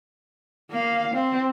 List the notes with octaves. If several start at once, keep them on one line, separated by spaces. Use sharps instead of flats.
A#3 F5
C4